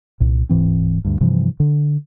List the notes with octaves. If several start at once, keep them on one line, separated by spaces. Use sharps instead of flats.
C2 A#2
D1 G#2 E3 C4
D2 G2
G2 C3 E3 F3
D3